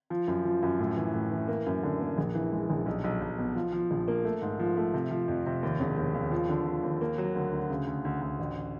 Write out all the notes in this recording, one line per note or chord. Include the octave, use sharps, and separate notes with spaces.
F3
F#2
F3
F#2
A2
E3
A2
E3
A#3
F#2
D3
A#3
A#1
E3
G#3
A#1
B1
B1
B1
B2
F3
F3
A#1
A#3
A3
G#2
F3
A3
C3
F3
F2
C3
D#2
E1
D#2
D#2
F3
D3
F3
D#2
A#3
F#3
D2
D2
C#3
D2
D2
D2
A1